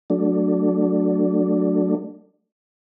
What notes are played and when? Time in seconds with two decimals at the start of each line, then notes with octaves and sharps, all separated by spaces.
0.10 F#3 A3 D4